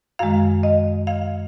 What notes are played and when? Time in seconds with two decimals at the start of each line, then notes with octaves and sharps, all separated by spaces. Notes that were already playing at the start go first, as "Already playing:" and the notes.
0.19 F#2 D#3 G#3 F5
0.63 D#5
1.07 F5